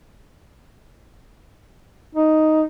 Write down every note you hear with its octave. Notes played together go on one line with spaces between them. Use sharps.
D#4